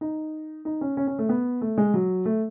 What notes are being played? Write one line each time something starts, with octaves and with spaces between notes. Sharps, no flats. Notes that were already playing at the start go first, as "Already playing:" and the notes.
D#4
D#4
C#4
C#4
C#4
A3
B3
A3
G#3
F#3
A3